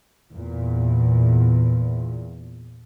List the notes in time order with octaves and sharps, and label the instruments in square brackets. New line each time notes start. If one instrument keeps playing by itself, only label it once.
[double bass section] E2 A#2